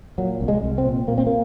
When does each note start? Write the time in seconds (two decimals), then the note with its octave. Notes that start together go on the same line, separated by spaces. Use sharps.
0.18 A#2 F#3
0.41 C2
0.48 G#3
0.63 C2
0.78 C4
0.86 A#2
1.08 A#2 A#3
1.18 C4
1.26 A#3